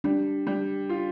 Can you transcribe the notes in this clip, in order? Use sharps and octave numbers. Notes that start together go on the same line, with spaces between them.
G3 D4
G3
F4